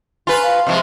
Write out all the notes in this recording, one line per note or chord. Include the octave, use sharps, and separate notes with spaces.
F4 B4 G#5 A#5 C#6
F5
C3 F3 G#3 D#5 C#6